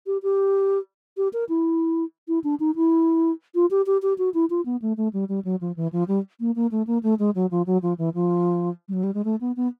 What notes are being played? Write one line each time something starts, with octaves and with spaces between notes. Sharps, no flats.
G4
G4
G4
A#4
E4
E4
D4
D#4
E4
F4
G4
G4
G4
F#4
E4
F4
B3
A3
A3
G3
G3
F#3
F3
E3
F3
G3
A#3
A#3
A3
A#3
A3
G#3
F#3
F3
F#3
F3
E3
F3
G3
F#3
G3
G#3
A3
B3
B3